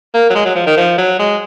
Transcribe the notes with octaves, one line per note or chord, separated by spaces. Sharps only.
A#3
F#3
G#3
F#3
F3
D#3
F3
F#3
G#3